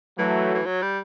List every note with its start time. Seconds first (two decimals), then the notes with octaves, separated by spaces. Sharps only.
0.18 E3 F#3 A3
0.55 E3
0.66 F#3
0.82 G3